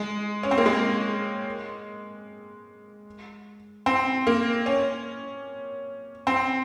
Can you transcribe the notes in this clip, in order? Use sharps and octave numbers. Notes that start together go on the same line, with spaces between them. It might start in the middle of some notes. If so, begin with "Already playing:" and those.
Already playing: G#3
C#4
C4
A#3
G#3
C4
A#3
C#4
C4